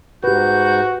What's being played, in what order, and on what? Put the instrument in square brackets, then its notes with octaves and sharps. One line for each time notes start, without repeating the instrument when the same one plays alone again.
[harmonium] G#2 [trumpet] F#4 [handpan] G4 B4 [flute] G6